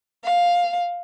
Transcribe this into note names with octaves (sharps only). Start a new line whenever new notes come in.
F5